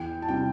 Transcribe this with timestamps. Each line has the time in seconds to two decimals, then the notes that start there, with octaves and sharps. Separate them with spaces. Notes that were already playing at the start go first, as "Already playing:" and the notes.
Already playing: E2 G5
0.22 A5
0.28 C3 G3 G5